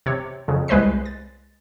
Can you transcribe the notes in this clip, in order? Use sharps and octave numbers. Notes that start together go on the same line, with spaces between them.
C3 C#5
F2 C#3
C2 G#3 B4 C5 D#5 C7
A6